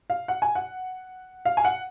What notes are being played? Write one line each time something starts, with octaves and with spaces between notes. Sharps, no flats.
F5
F#5
G#5
F#5
F5
G#5
F#5